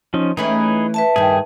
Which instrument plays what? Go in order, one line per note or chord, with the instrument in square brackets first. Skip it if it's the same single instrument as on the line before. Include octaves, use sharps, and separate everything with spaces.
[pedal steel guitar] F3 C#4 D#4
[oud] E3 A3 C#4 [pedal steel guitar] D#4 G#4 B5
[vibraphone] B4 E5 A5
[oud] G2 D#3 [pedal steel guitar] G#4